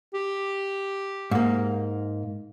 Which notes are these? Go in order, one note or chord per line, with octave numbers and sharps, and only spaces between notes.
G4
G#2 A#3